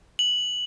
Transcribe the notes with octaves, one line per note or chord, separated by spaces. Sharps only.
F#7